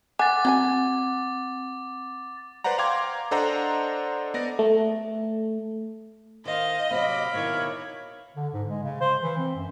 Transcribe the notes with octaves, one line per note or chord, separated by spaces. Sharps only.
F#5 G#5 D6 F#6 A6
F#3 C4 G4 G#5
B4 C5 D5 F#5 A#5
F5 G5 A#5 C6 D6 G#6
D4 A4 C5 D#5 F#5 A#5
B3 D5 A#6
A3
D#3 C5 D#5 F5
C3 F#3 C4 F5 B5 D6
B2 D#3 E4 C#5
D3
G#2
G#3
C#3
C5
E3
C4
F#2